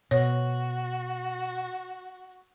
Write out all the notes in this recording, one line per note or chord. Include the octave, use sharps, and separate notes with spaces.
B2 F#4 C#5